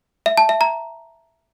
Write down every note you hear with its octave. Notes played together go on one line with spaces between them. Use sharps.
E5
A5
E5
A#5